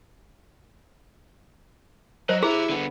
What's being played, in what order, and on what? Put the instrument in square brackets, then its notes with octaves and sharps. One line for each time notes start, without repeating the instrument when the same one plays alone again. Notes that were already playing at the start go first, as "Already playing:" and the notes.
[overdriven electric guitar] F#3 [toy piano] C5 [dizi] D#5
[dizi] E4 [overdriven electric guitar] G4 A#5 [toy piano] G#4
[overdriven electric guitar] D3 B3